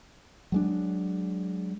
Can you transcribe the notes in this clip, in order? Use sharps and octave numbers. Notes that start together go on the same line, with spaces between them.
F#3 G#3 D4